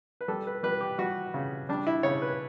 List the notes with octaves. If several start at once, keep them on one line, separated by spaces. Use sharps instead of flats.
B4
G3 A4
B4
G3 B4
G4
G3 F#4
C#3
G3 D4
E4
C#3 C#5
B4